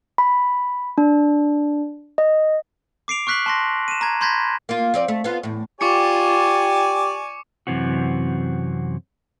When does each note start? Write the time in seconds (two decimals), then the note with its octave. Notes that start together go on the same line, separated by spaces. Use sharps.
0.18 B5
0.98 D4
2.18 D#5
3.08 D6 C7 D7 F7
3.27 C#6 F6 F#6 B6 C7 F#7
3.46 A5 C6 A#6
3.88 D#7 E7
4.01 A#5 G#6
4.21 B5 C6 G6 G#6 A#6 B6
4.69 A#3 F4
4.94 F3 C4 D5
5.08 A3
5.24 B3 F4
5.43 E2 A2
5.81 F4 G4 D5 G#5 C#6 D6 C#7
7.67 F#2 C3 E3 C4 F#4